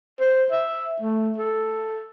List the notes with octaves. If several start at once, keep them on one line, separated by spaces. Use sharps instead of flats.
C5
E5
A3
A4